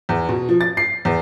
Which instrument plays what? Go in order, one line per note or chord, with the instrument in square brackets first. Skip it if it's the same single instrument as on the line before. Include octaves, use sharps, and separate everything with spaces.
[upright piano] E2
B2
F3
A6
C7
E2